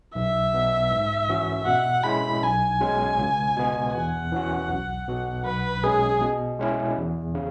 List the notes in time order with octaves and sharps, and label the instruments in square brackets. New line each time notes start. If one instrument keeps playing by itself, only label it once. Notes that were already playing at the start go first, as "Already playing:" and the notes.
[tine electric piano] B1 [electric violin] E5
[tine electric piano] B2 B3
G#2
E3 C#4 F#4
[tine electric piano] B2 [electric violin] F#5
[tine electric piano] G#3 C#4 E4 [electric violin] B5
[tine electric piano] B1 [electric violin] G#5
[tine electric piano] B2 G#3 C#4
C#2
B2 B3
[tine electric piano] E2 [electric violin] F#5
[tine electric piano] E3 C#4 F#4
B1
B2 B3 F#4
[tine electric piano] B1 [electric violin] B4
[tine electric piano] B2 G#3 C#4 [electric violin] G#4
[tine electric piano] B2
G#3 C#4 E4
E2
C#3